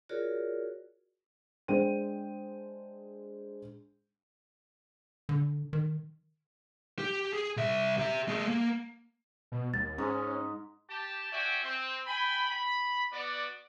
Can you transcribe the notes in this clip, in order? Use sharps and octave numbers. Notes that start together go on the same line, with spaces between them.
F4 F#4 G#4 A#4 C#5 D5
G#3 D4 C5 G5 D#7
D3
D#3
G4
G#4
C2 E5
G4 E5
A3 G#4
A#3
B2
D#2 A6
G#2 C#4
G4 A5
F#4 D5 E5 G5 G#5
C4
G5 G#5 B5
B5
B3 F#4 D5